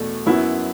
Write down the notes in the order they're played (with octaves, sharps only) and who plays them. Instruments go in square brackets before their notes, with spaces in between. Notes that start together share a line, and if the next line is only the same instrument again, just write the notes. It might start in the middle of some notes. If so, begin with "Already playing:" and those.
Already playing: [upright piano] E2 B2 A3
F#2 F#3 B3 E4